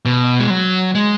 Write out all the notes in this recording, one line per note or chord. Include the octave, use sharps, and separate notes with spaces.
B2
G#3
F#3
G#3